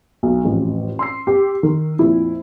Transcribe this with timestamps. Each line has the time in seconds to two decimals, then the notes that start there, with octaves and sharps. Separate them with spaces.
0.23 B1
0.44 A1 F2 A2
0.99 C6 E6 C7
1.27 G4
1.63 D#3 A#4
1.99 F2 A#2 E4